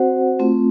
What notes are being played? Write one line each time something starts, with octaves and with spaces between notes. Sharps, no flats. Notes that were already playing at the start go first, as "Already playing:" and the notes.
Already playing: C4 F#4 C5 F#5
A3 C4 F4